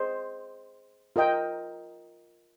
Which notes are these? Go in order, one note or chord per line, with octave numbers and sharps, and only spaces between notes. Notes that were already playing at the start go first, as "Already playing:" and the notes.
Already playing: G#4 C5 D#5
F4 A#4 D#5 G5